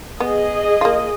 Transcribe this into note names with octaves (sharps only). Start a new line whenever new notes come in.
B3 G#4 D#5
A#3 F4